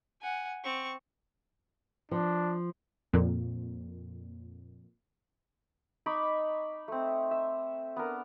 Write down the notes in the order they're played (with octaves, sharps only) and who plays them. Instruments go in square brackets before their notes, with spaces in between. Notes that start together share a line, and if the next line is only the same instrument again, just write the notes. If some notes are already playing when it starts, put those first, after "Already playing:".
[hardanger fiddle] F#5 G#5
C4 C#6
[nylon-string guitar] F3 [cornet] D4
[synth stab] F2 A#2
[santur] D#4 B5 C#6 D6
A3 C4
E5
B3 D4 A#4